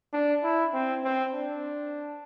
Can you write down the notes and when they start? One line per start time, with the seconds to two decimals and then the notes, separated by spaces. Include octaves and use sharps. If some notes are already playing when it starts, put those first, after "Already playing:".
0.13 D4
0.43 E4
0.74 C4
1.04 C4
1.35 D4